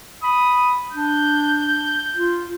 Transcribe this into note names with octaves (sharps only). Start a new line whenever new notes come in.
B5 D#6
D4 G6
F4